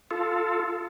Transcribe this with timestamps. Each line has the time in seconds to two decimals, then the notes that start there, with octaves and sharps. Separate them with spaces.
0.11 F4 A4